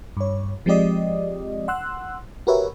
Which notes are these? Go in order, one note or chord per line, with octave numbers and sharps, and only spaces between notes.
G2 C#5
F3 G#3 C4 G4 D5 D#5
F#5 C6 E6 F#6
F#4 G4 A#4 B4 C#5 E5